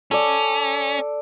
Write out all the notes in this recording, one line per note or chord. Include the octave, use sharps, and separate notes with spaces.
C#4 A4 D5